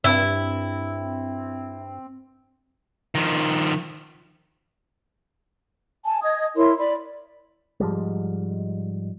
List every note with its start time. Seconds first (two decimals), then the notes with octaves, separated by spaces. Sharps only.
0.04 G2 C4 E4
3.15 D#3 F3
6.05 G#5 A5
6.22 D#5 D#6 G#6
6.56 E4 A#4 C#5 C6
6.78 D5 B5
7.80 G#2 F3 G3 G#3